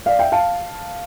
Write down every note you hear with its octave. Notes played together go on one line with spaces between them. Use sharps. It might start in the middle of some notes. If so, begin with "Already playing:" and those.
D5 F5
E5 G5
F5 A5